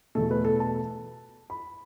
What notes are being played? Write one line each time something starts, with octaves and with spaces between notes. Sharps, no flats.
E2 B2 A3 A4
B4
A4
A5
B5